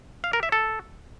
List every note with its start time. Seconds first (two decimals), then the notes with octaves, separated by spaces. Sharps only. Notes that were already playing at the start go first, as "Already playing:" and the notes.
0.24 F5
0.33 A#4
0.43 E5
0.52 A4